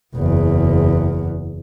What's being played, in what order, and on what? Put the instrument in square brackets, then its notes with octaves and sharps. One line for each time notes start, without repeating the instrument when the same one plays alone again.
[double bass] F#1 E2